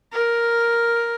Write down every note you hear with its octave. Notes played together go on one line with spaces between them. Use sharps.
A#4